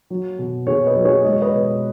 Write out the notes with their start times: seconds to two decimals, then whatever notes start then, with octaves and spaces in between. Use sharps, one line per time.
0.10 F#3
0.39 B2
0.67 B2 G#4 C#5
0.86 B4 D#5
0.96 F#3
1.05 G#4 C#5
1.24 G#3 D#5
1.33 C#5
1.42 B4 D#5
1.54 B2